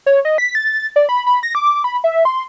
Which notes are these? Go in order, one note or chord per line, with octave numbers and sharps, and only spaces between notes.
C#5
D#5
B6
A6
D5
B5
B5
A#6
D6
B5
E5
C6